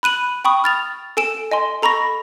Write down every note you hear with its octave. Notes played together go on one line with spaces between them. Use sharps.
B5 F#6 D#7 F#7
G5 B5 C#6 D#6
F6 A6 F7
A4 G#5 D7 E7
D#5 G#5 C6
A4 A#5 B5 C#6 A#6